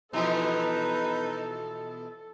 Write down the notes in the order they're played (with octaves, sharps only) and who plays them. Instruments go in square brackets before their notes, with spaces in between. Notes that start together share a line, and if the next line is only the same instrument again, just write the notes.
[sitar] B2 E3 F3 [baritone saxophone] D#4 [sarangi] A4 [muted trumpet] B4